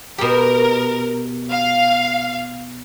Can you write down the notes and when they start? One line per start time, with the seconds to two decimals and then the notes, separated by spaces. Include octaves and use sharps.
0.18 B2 G4 A#4
1.49 F5